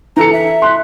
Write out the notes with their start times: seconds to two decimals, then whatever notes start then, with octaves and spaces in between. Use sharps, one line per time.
0.16 E3 A4 A#5 C#7
0.33 E5
0.62 C6 F#6